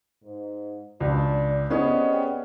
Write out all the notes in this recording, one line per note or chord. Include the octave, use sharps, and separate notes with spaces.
G#2
C#2 D4
C3 B3 C#4 G#4 D5 D#5 F#5
B4 D5 G5